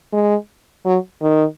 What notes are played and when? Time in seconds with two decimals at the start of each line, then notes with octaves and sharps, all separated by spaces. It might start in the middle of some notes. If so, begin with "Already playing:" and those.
0.13 G#3
0.86 F#3
1.22 D#3